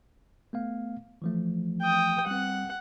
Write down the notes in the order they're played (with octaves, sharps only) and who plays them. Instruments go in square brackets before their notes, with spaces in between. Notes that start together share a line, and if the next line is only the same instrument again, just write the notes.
[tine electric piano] A3 B3 F5
E3 F3 A3
[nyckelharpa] G5 D#6
[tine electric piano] G3 C4 [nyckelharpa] F#5